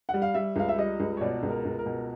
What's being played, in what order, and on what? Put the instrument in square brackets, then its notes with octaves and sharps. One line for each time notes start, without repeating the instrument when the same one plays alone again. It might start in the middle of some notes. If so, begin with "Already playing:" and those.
[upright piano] G3 F#5
F5
G3 E5
C#2 F5
E5
G3 D#5
C#2
C#5
B2 D5
C#2
A#4
C#2
A#4
B2